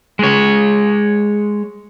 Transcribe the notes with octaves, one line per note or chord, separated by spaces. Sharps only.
G#3 C#5